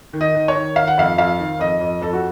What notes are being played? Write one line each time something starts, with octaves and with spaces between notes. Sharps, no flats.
D#3
D#5
D#3
C#5
D#3
D#3 F5
F#5
F2 F5
F2 F5
D#3
F2 D#5
F2
F2 A4
F#4